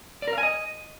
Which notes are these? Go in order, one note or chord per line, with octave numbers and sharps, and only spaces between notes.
D5
A#4
F5
G#5
D#5